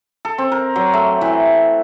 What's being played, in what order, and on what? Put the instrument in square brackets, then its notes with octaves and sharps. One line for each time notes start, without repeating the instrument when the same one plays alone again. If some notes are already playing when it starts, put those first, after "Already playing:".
[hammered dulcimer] A4
C4
A#4
F#3
A3
E3